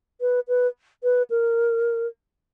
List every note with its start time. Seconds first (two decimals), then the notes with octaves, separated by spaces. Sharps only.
0.21 B4
0.48 B4
1.03 B4
1.30 A#4